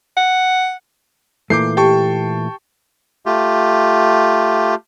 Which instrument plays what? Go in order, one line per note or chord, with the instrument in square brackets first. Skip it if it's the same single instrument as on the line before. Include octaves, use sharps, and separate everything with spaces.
[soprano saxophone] F#5
[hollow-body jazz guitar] A#2 E3 A3 [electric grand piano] D6 G6 C7
[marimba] G4 [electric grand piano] G5 A5 C#6
[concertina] A3 F4 G4